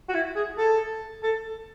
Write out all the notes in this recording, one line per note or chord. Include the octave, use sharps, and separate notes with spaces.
F#4
E4
G#4
A4
A4